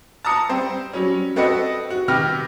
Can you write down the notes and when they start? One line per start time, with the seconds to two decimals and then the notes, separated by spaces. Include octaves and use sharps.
0.25 A5 A#5 D#6 C#7
0.49 G3 C4 C5
0.93 F#3 G3 C#4
1.36 C4 F#4 A4 B4 D#5 C#7
1.90 F#4
2.08 C3 D#3 G4 B4 F6 A#6